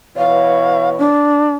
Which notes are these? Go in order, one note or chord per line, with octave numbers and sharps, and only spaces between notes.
B2 E3 C#5 F5
D4